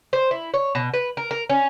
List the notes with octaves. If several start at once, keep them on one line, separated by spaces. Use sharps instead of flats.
C5
E4
C#5
B2
B4
A#4
A#4
C#4